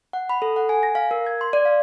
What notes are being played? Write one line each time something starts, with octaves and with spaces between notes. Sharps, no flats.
F#5
B5
A4
F#5
G#5
A#6
F5
A#4
G#6
C6
D5
F5